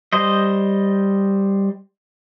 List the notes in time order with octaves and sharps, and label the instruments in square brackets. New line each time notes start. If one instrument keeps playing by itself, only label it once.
[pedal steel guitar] G3 C5 D#5